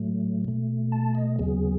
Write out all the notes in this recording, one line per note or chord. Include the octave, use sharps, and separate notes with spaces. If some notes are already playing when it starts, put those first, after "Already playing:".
Already playing: A2 F#3 A3
B2 A3
A5
D#5
D#2 C#3 F#3 B3 G#4